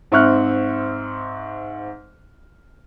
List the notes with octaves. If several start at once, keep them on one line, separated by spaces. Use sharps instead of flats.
G#2 C4 E5 C#6 F6 F#6